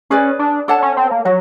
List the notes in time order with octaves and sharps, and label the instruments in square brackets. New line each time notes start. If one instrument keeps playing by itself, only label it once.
[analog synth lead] C#4 [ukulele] G#4 B4 D5
[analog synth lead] D4
[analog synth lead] D4 [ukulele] A4 C#5 F#5 A5
[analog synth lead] C#4
C4
A#3
[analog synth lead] F#3 [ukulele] F#4